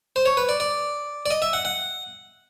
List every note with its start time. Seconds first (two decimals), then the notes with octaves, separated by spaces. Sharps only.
0.16 C5
0.26 C#5
0.37 B4
0.49 D5
0.60 D5
1.26 D5
1.31 D#5
1.42 E5
1.53 F#5
1.65 F#5